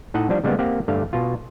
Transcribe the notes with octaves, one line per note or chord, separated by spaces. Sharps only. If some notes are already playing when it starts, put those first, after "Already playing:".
A2 D#4 A4 D#5 F#5
F3 G3 D4
C#3 G3 G#3 A#3 B3
A#3 C4 G4 F5 F#5
G2 D3 A3 D5 F5
B2 F4